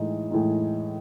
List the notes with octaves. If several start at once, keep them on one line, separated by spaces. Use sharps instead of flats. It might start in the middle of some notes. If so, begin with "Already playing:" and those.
Already playing: A2 E3 G#3 D#4
A2 E3 G#3 D#4